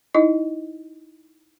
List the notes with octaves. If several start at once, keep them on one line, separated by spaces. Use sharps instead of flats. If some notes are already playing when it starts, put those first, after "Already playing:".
D#4 E4 D#5